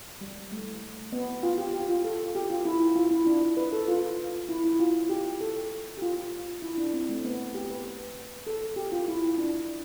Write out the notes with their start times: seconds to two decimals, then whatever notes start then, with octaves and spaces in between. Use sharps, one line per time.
0.21 G3
0.52 A3
1.12 B3
1.43 F4
1.58 G4
1.73 G4
1.89 F4
2.04 A4
2.35 G4
2.50 F4
2.65 E4
2.96 F4
3.11 E4
3.26 D4
3.57 B4
3.72 A4
3.88 F4
4.49 E4
4.64 E4
4.80 F4
5.09 G4
5.41 A4
5.98 G4
6.02 F4
6.62 E4
6.78 D4
6.94 C4
7.09 A3
7.25 B3
7.55 G4
7.70 B4
8.47 A4
8.76 G4
8.92 F4
9.08 E4
9.38 D4